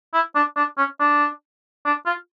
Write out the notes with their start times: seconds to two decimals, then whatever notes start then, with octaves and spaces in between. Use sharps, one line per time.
0.14 E4
0.36 D4
0.57 D4
0.78 C#4
1.00 D4
1.86 D4
2.06 F4